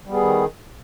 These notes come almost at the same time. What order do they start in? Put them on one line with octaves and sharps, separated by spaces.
G3 B3 G#4 D#3